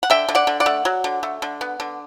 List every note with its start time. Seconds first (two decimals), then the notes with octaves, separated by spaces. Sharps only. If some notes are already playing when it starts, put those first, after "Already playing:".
0.03 F#5
0.10 D3 E5 G5
0.29 D3
0.35 D5 F#5
0.47 D3
0.60 D5 F#5
0.66 A3
0.85 F#3
1.04 D3
1.23 A3
1.42 D3
1.61 B3
1.80 D3